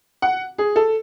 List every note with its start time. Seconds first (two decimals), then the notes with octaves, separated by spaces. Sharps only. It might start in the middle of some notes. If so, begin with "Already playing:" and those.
0.22 F#5
0.58 G#4
0.76 A4